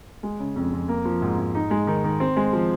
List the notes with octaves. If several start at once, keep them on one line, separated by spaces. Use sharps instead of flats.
G#3
C#3
F2
F2
A#3
F3
G#2
G#2
D#4
G#3
D#3
D#3
C4
G#3
F3